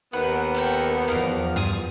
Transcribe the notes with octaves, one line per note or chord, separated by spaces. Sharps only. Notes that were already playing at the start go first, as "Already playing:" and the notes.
D#2 B3 B4 F#5
A4 A#4 G5
E2 F3 D#4 A#4 F5
G2 F4 G#5 D#6